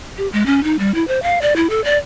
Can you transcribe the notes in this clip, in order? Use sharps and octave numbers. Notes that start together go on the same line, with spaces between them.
G4
G#3
C#4
D#4
G3
E4
C5
F5
D5
E4
A4
D5